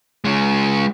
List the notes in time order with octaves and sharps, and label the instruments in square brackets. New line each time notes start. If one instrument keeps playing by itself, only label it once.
[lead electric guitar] C#3 G#3